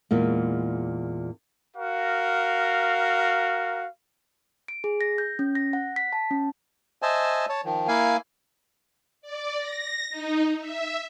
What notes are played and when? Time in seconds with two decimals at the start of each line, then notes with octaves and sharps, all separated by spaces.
0.11 E2 A#2 G#3
1.76 F#4 A#4 F5
4.68 D7
4.84 G#4
5.01 A#6
5.18 G6
5.39 C#4
5.55 A#6
5.73 F#5
5.96 B6
6.13 A5
6.31 C#4
7.02 C5 D#5 E5 G#5 A5
7.49 C#5 A5
7.65 D#3 F3
7.88 A#3 E4 F5 G#5
9.22 D5
9.58 A#6
10.10 D#4
10.59 E5